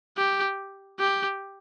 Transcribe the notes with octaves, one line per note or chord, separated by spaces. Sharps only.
G4
G4